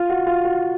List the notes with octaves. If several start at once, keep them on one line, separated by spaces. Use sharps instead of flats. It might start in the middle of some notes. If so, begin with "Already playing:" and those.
Already playing: F4
F#4
F4
F#4